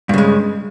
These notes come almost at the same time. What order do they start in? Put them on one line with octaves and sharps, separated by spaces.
G2 C#3 G#3